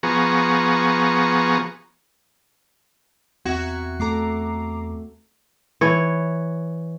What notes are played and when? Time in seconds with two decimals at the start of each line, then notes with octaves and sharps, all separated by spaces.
0.03 F3 B3 G#4 A#5 C#6
3.45 E2 C4 F#4 E5 A#5 G#6
4.00 A3 A4 A#5 D6 C7
5.81 E3 C#5